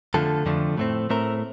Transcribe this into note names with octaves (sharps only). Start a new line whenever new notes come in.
F2 D3 F3 A3 A4
F2 D3 F3 A3
A2 A3 C4
A2 A3 C4 A#4